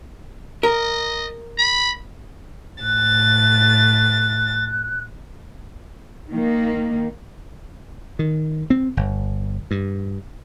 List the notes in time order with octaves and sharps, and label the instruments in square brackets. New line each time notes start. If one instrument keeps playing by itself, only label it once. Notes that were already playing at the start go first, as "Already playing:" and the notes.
[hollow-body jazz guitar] A#4 [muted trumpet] D#5
[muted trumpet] B5
[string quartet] A2 A6 [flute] F#6
[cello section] D#3 A#3
[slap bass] D#3
C4
G1
G2